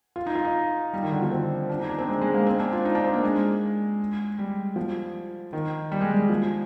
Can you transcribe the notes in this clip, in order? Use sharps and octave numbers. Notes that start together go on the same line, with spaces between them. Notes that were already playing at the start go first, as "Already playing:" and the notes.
F4
D#4
F4
D#4
G3
D#3
D3
F3
C4
D4
D#4
D4
C4
G#3
G#3
A#3
C4
D4
F4
D#4
D4
C4
A#3
G#3
G3
F3
D#3
G3
G#3
G3
F3